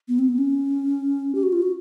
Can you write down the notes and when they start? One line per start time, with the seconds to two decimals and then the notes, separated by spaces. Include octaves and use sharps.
0.08 B3
0.19 C4
0.28 B3
0.38 C#4
1.35 G4
1.43 F#4
1.53 F4
1.62 F#4